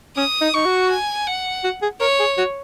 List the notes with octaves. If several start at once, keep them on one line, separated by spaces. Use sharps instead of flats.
C#4 D#6
D#4
D#4 C#6
F#4
G#5
F#5
F#4
G#4
A#4 C#5
G#4
F#4